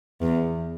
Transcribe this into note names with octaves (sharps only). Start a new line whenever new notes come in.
E2